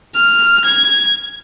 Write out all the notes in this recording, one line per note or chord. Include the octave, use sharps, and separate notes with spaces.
F6
G#6